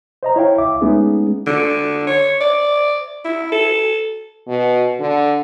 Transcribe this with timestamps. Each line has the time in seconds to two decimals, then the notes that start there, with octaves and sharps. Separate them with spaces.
0.23 C5 D#5 A#5
0.36 E4 C#5 F5 G5
0.58 C#2 E5 D6
0.81 G#3 A3 B3 C#4 D#4 G#4
1.47 D3
2.07 C#5
2.41 D5
3.25 E4
3.52 A4
4.47 B2
5.00 D3